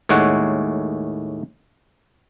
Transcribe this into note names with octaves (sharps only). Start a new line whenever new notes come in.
D#2 A2 G#3 C#5 F#5